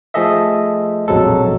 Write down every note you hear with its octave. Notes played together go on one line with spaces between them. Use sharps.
F3 A3 G#4 A4 D#5 E5
A#1 F2 B2 F#3 G#3 A4